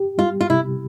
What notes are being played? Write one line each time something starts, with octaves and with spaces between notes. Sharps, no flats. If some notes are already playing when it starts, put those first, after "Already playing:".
Already playing: G4
G3 F4
F4
C3 E4